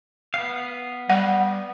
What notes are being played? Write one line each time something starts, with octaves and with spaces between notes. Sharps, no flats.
B3 F5
G3 F#5